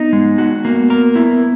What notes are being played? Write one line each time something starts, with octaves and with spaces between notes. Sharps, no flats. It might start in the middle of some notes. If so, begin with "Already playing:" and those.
Already playing: B3 D#4
G#3
F#4
A#3 B3
A#4
E4